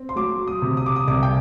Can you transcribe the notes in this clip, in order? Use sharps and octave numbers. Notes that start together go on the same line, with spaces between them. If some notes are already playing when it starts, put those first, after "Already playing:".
Already playing: C4
C6
F#3 D6
D#6
C3
D#6
D6
D#6
C2 D6
G5